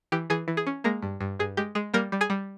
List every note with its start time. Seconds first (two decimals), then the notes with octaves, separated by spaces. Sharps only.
0.12 E3 G4
0.30 E3 G#4
0.48 E3
0.57 G#4
0.67 C#4
0.84 G#3 A#3 A#4
1.03 G2
1.21 G2
1.39 G2 G#4
1.57 G#3 G4
1.75 G#3 G#4
1.94 G3 A#3 A#4
2.12 G3
2.21 G#4 G#5
2.30 G3